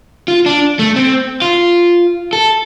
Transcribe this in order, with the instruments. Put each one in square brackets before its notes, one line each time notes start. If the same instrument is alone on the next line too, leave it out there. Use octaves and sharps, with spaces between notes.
[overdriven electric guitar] F4
D4
A3
C4
F4
A4